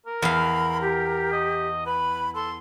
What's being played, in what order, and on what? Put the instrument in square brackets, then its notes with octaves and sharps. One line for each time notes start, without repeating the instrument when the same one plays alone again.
[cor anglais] A#4
[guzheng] E2 F5 [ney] B5
[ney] G4
[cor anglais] D#5
[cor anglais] B4 [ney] B5
[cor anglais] A4 [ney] C6